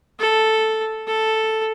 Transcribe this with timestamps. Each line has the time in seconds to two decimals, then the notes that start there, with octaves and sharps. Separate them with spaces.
0.19 A4
1.07 A4